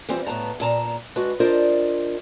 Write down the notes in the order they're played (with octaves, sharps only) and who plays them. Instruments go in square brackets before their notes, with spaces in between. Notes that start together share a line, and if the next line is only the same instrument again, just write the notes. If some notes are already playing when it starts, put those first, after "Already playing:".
[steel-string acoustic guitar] E3 F3 G3 C4
A2 B3 A5 A#5
A#2 A5 A#5
G#3 D4 F#4 B4
D4 F4 A#4 C5 D5 D#5